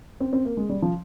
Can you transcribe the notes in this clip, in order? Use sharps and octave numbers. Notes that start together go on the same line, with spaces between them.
C4
C4
A#3
G#3
G3
F3